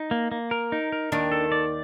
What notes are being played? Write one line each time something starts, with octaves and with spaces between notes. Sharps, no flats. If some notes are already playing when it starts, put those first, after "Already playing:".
Already playing: D#4
A#3
A#3
A#4
D#4
A#4
D#2 D#3 D4
A4
D5